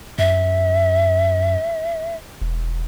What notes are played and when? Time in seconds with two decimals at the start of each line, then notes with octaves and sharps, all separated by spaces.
0.18 F#2 E5
2.41 E1